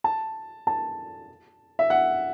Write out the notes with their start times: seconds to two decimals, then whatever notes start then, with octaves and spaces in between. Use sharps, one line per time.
0.04 A5
0.67 A5
1.79 E5
1.90 F#5